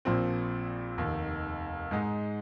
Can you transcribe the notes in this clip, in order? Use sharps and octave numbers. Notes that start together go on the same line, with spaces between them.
A#1 A#2 F3 C4
F1 D#2 D#3
G#2 G#3 D#4